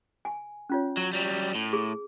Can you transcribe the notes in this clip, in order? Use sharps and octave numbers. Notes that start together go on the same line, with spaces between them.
G#5
C#4 F4 C#5
F#3
F#3 G3
A2
G#4